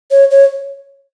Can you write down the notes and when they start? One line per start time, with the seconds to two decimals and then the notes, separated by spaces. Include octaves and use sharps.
0.11 C#5
0.31 C#5